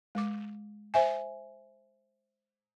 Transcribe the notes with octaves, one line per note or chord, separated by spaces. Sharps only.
G#3 D6
C5 E5 G#5